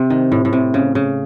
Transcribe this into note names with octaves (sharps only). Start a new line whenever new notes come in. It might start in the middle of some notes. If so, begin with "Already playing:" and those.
Already playing: C3
D#3
A2
A2
C3
C#3
C#3